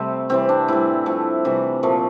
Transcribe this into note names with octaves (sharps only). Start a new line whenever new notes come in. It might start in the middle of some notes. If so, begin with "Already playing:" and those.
Already playing: C3 G3 A3 C4 C5
C3 E3 G3 C4
D4
A2 E3 G3 E4
A2 F3 A3
C3 E3 G3
A#2 F3 A3